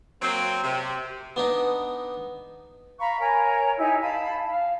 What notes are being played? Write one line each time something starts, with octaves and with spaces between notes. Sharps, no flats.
F#3 A#3 C4
C3
B3 D4 D#4
F5 A#5 B5 C#6
A#4 C#5 G#5 A#5
D#4 E4 G4 G#5
F5 A5 B5
F5